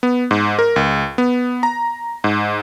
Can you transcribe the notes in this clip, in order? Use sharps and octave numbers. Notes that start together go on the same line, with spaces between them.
B3
G#2
A#4
C#2
B3
A#5
G#2